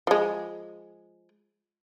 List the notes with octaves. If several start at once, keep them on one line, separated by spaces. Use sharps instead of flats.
F3 G#3